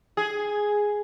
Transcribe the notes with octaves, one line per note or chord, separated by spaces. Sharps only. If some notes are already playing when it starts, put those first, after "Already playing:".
G#4